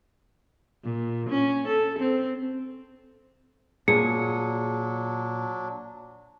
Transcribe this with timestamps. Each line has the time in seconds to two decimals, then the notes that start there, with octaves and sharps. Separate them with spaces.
0.84 A#2
1.29 C#4
1.68 A4
1.99 C4
3.88 A#2 F#3 D4 G#4 C#7